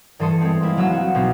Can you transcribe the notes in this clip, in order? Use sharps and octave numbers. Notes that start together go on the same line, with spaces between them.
G2 E3 A4 C6 D#6 C#7
G#3 C4
A#3 C4 E4
F3 F#3 F#4 E6
C4 F#4
B1 B2 C4